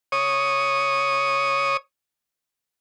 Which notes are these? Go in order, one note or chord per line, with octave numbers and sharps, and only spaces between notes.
C#5 D#6